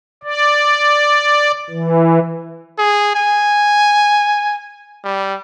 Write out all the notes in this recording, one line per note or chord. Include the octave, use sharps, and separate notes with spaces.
D5
E3
G#4
G#5
G3